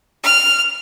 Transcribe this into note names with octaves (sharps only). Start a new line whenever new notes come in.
F6